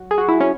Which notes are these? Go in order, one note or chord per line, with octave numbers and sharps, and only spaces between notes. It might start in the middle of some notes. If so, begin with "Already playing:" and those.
Already playing: F#3 F#4
G#4
F#4
E4
C#4